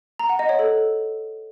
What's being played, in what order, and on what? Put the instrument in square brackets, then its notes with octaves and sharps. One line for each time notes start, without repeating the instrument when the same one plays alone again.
[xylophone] A#5
F#5
D#5
C#5
A4